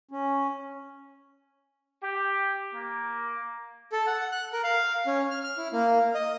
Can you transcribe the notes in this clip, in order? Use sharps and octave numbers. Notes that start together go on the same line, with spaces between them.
C#4
G4
A#3
A4
F#5
F#6
A#4
F5
C#4
F6
F6
E4
A#3
D#5